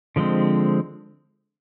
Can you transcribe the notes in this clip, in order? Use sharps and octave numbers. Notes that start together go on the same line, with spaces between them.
D3 F3 G#3 C4